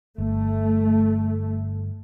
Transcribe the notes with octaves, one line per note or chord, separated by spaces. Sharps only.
G1 A3